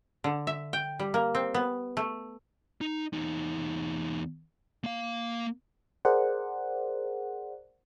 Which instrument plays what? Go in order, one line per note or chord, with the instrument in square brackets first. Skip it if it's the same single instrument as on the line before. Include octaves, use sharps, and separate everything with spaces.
[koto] D3
E5
G5
G3
A#3
C4
B3
A3
[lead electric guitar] D#4
E2 D#4
A#3 F5
[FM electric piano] G#4 A#4 C5 D5 F#5